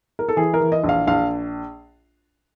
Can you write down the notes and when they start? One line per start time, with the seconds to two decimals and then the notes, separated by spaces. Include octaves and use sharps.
0.19 A#4
0.28 A4
0.36 E3 G#4
0.54 A#4
0.60 E3
0.72 D#5
0.84 A#1
0.89 F5
1.07 A#1 F5